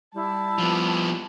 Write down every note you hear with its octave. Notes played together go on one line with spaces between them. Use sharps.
G3 E4 A5
F3 B3